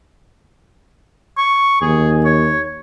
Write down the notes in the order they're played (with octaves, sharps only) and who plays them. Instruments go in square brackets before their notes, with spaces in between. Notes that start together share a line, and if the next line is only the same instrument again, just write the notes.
[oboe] C#6
[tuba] D#2 [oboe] G#4
[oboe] C#5